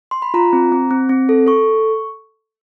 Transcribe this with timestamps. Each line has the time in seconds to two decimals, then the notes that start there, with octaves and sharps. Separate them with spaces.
0.11 C6
0.22 B5
0.34 F4 A#5
0.53 C4
0.72 C4
0.91 C4
1.09 C4
1.29 A4
1.47 A4 C#6